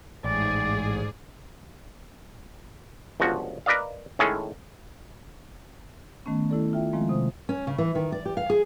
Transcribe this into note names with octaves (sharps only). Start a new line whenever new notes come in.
A1 G#2 G#4 D5
G1 C#2 F3 F#4
A#4 B4 D5 D#5 F5
A2 D#3 G#3 C#4 G#4 A4
D#3 A3 B3 C#4
A3 E4 G4 A4 D5
F4 E5 G5
D#3 F3 G#3 A#3 C4
C3 C5 D#6
C#4
C#3
E3
D#3
D5
G4
F5
G#4